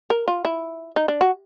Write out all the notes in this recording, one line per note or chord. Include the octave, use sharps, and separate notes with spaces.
A#4
F4
E4
D#4
D4
F#4